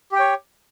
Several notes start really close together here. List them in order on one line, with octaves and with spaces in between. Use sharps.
G4 G5 C#5